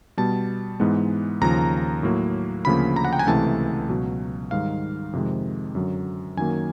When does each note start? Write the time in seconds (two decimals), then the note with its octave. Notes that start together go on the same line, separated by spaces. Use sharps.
0.17 B2 G3 B3 A5
0.80 G#2 E3 G#3 B3
1.41 D#2 C#3 F3 A#5
2.03 A2 F#3 A#3
2.65 D2 C#3 F3 A#3 B5
2.96 A#5
3.05 F#5
3.13 G5
3.19 G#5
3.27 C#2 C3 E3 A3 A5
3.89 C#2 B2 F#3
4.51 G#2 D#3 G3 F5
5.13 F2 C3 D#3 G#3
5.75 F#2 D3 F#3
6.37 F#2 D#3 F#3 A#3 G#5